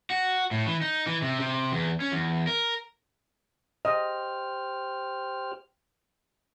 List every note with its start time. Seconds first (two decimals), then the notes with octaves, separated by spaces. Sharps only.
0.10 F#4
0.51 A2
0.66 E3
0.81 D#4
1.07 E3
1.22 C3
1.40 C3
1.72 E2
2.00 C#4
2.12 E2
2.47 A#4
3.85 G4 C5 D#5 F6